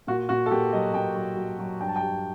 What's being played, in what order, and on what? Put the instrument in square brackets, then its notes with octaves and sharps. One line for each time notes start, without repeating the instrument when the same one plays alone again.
[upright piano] A#2 F#4
A#2 F#4
A4
A#2 G4
F#3 D#5
A#2 G5
F#3
F#3
F#3
G2 G5
A5
G5
G3